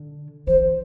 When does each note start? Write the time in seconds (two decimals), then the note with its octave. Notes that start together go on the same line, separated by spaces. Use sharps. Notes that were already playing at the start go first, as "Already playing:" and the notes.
Already playing: D3
0.47 E3 C5